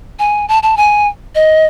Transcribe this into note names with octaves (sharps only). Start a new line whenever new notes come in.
G#5
A5
A5
G#5
D#5